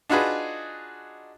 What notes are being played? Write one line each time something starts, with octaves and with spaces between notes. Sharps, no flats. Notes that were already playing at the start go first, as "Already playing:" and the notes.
D4 D#4 F4 F#4 G#4 B4